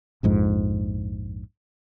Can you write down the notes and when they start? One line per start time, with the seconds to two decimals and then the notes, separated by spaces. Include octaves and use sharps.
0.23 A#1 F2 G#2